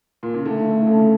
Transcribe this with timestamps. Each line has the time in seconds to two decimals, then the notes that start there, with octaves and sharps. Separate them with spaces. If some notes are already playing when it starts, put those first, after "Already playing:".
0.23 A#2
0.34 C#3
0.45 D3 A3
0.82 D3
0.87 C#3
0.99 C#3